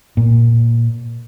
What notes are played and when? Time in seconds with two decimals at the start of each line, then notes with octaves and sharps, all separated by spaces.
0.17 A#2